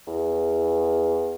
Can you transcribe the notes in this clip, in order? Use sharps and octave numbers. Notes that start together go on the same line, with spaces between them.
E2